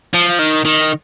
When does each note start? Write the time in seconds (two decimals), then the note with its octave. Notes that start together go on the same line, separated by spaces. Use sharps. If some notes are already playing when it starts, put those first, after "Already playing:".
0.14 F3
0.39 D#3
0.65 D#3